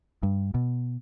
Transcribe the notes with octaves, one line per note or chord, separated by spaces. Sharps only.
G2
B2